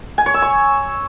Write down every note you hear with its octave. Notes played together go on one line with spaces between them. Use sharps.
G#5
C#5
E6
C#6